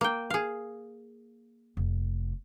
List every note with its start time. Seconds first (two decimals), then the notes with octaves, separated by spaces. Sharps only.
0.01 A#3 G5
0.30 G#4 F5
1.77 F1